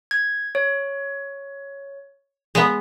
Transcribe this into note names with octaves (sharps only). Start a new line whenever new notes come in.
G#6
C#5
G#3 B3